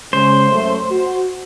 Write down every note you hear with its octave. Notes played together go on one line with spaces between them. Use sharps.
C#3 G#3 C5
F#2 A3
F#4